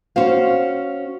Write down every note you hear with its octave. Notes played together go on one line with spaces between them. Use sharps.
C#4 F#4 C5 F5